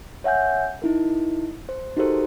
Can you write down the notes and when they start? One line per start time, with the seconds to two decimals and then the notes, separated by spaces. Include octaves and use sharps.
0.24 C#5 E5 F#5 G#5 G6
0.82 D#4 E4 A#4
1.69 C5
1.97 D#4 F#4 G4 A4 A#4 C5